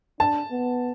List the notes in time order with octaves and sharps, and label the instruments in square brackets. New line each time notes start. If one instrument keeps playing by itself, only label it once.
[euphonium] D4 [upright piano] A5
[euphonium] B3